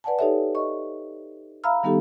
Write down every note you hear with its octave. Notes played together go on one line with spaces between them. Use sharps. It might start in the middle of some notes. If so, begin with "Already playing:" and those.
B4 D5 F#5 G#5 A5
D#4 G4 A4 C#5 E5
D#5 C#6
E5 F5 A#5 B5 E6 F6
D#3 G3 B3 D#4 G4 A4